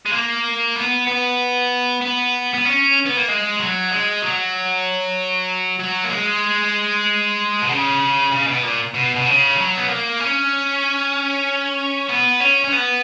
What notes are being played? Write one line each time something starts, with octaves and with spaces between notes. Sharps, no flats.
G#3
A#3
B3
B3
B3
B3
C#4
B3
A#3
G#3
F#3
G#3
F#3
F#3
A#3
G#3
B2
C#3
C#3
B2
A#2
B2
B2
C#3
F#3
B3
A#3
C#4
B3
C#4
C#4
B3